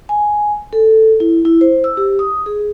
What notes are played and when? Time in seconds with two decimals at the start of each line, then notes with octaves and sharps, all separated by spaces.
0.09 G#5
0.73 A4
1.20 E4
1.45 E4
1.61 C5
1.84 E6
1.97 G4
2.19 D#6
2.46 G#4